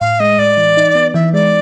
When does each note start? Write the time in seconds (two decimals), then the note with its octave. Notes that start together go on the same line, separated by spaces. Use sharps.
0.01 A2 F5
0.20 G#3 D#5
0.39 A2 D5
0.57 E3
0.77 D#4
0.95 B3
1.14 E3 E5
1.33 G#3 D5